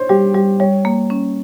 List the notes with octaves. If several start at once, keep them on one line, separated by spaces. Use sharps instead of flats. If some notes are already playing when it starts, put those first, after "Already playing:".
Already playing: C5 C#5
G3 G4
G3 G4
G3 C#5
A#3
C#4